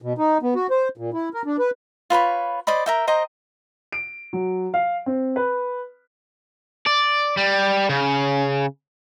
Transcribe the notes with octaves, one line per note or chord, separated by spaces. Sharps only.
B2
D#4
B3
F#4
C5
A#2
E4
A#4
D4
B4
F4 B4 C#5 B5
C5 D5 D#5 B5
A#4 E5 G5
C5 D#5 G5 A#5
D7
F#3
F5
C4
B4
D5
G3
C#3